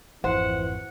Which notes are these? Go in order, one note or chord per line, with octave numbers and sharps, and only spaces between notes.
G#1 F2 E3 C5 F#5